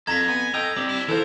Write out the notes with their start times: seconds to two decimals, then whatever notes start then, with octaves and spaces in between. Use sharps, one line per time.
0.07 F2 F4 A4 A#5 G#6 A#6 B6
0.28 B3 G#5
0.54 A4 D#5 G5 A#5 E6
0.77 G2 C4 G4 D5
0.89 D4 E4
1.09 E3 F4 A4 A#4 C5